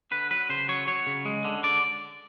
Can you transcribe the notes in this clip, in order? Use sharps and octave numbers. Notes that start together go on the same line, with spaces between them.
D3 B4
F#3 B4
C#3 C5
F#3 C#5
F#3 C#5
C#3
G#3
D3
D3 D5